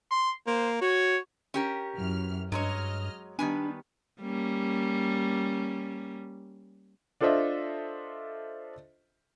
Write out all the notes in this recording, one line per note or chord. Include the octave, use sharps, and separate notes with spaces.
C6
A#3 C5
F#4 C#5
C#4 G4 A#4
F#2 E3 F6
G2 F#3 G#3 C#5 D#5 F6
D#3 G3 B3 D4 B4 G#5
G3 A#3 C#4
D4 F4 A4 C5 D#5 E5